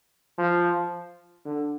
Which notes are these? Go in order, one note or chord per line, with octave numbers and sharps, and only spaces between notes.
F3
D3